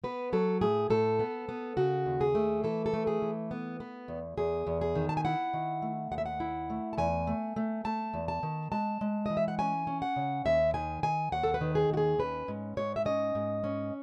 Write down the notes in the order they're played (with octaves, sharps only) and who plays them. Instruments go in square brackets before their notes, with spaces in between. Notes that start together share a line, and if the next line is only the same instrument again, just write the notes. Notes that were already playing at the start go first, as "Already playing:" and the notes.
[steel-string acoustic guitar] B3 B4
F#3 A4
A2 G#4
A2 A4
B3
B3
C#3 F#4
D#2
G#4
A3
E3 A4
A4
A3
G#4
E3
B3
B3
E2
E2 G#4
E2
G#4
D#3
A5
G#5
E4 F#5
D#3
A3
D#2 F#5
E5
F#5
E4
A3
A5
E2 G#5
A3
A3
A3 A5
E2
A5
D#3
G#3 A5
G#3
E3 D#5
E5
F#5
C#4 G#5
C#4
F#5
C#3
D#2 E5
D#3 G#5
D#3 G#5
D#2 F#5
A4
B4
D#3
G#4
D#2 F#4
G#4
C#4 B4
G#2
G#2 C#5
E5
C#4 D#5
G#2
C#4